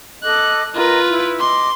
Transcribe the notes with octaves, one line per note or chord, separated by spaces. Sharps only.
A4 D#5 D6 F#6
F4 A#4 B4 D#5 A#5
E4
D#5 C6 D6